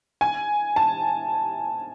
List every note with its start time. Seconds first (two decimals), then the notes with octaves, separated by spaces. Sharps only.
0.21 G#5
0.76 A5